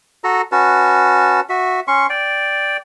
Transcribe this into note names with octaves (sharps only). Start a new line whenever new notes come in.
F#4 A4 A#5
C#4 F#4 B4 A5
F#4 E5
C#4 C6 C#6
D5 G5